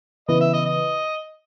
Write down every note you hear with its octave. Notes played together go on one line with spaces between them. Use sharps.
C#3 E3 B3 E4 B4 D#5
E5
D#5
D#5